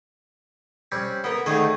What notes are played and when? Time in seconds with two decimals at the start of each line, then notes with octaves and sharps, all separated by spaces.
0.92 G3 C4 C#4
1.24 A#3 B3 A#4
1.46 D2 D3 D#3 A3 D#4 G#4